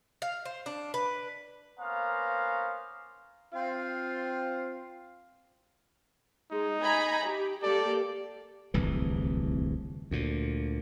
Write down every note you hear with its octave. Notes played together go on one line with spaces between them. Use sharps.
F5
C5
D4
B4
A#3 B3 C#4 C5 F5 A#5
C4 F4
G#3 D#4
G#5 A#5 B5
G4
A#3 G4 A4 D5
D1 C2 F2 E3
D2 A#2